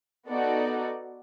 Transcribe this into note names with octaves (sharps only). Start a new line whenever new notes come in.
B3 D#4 F#4 A4 D5